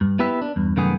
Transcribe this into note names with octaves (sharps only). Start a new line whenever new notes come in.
G2
B3 E4 G4 B4 E5
D4
E2 G2
C2 F#2 D#3 A3 B3 G#4